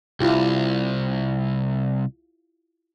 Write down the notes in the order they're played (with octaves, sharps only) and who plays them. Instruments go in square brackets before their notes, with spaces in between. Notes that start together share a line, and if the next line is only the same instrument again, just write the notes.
[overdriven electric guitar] C2 [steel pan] E4 F4 G4